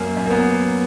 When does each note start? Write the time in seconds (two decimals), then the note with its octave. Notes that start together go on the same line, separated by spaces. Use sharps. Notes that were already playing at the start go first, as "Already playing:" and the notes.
Already playing: F#2 A#3
0.17 F#2
0.26 A#3
0.31 B3